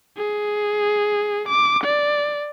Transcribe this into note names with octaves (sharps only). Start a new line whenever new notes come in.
G#4
D6
D5